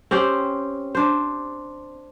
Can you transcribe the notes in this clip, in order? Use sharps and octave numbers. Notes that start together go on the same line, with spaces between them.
C4 C#4 G4 C5
D4 C5